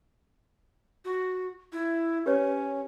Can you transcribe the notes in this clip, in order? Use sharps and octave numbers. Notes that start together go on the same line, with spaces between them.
F#4
E4
C#4 G4 B4 C#5